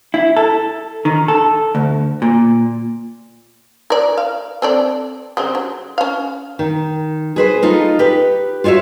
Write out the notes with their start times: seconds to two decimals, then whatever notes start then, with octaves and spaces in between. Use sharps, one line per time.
0.14 E4
0.36 A4
1.05 D#3
1.28 A4
1.75 D2
2.22 A#2
3.90 A#4 D5
4.18 F5
4.62 C4 A4 D5
5.37 C#3 G3 C4
5.55 F#3
5.98 C#4 F5
6.59 D#3
7.36 G#4 B4 C5
7.63 D#4 F4 A4
7.99 G4 B4
8.64 F4 F#4 C#5 D5 E5